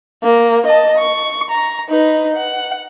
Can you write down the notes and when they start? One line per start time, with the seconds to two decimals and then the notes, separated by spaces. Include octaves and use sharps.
0.24 A#3
0.66 D#5 A5
0.98 C#6
1.50 A#5
1.90 D#4 B4
2.36 F#5